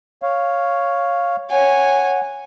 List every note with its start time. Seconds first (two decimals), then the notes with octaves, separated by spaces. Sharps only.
0.22 C#5 F5
1.51 C#5 F#5 G#5